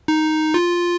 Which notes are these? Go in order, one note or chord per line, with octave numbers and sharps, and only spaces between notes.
D#4
F4